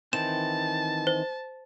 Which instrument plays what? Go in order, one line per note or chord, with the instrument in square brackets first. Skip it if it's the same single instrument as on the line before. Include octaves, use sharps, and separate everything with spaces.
[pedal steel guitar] D#3 E3 C4 [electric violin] A5 [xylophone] E7
[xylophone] C5